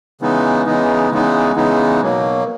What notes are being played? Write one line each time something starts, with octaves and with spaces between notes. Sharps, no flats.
C#3 E3 G#3 B3 D#4
C#3 E3 G#3 B3 D#4
C#3 E3 G#3 B3 D#4
C#3 E3 G#3 B3 D#4
B2 F#3 A#3